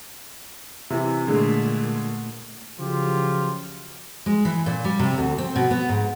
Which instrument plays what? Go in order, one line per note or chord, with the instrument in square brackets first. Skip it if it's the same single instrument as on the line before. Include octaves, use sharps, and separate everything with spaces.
[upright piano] C3 E3
[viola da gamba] A#2 A3 [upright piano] D3 G#3
[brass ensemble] C#3 F3 F#3 F4 G4
[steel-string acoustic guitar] G#3
E3
A#2
G3
C3
D2
C4
B2
B3
G#2